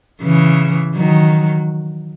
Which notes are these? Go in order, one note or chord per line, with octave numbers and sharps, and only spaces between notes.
C#3 E3
D#3 F#3